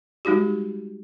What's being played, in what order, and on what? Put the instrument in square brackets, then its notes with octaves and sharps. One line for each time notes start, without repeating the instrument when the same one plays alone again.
[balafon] G3 G#3 D#4 F#4 G4